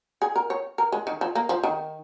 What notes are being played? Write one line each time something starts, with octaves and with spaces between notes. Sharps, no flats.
G#4
A#4
C#5
A#4
G#3
D#3
F3
A#3
F3
D#3